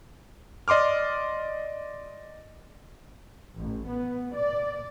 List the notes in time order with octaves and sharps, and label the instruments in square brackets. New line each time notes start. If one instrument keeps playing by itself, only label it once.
[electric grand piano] D5 D#5 C6 D6 F6
[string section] A1
B3
D5